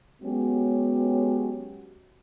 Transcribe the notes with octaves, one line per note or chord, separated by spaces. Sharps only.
F#3 G#3 B3 C#4 F#4 G4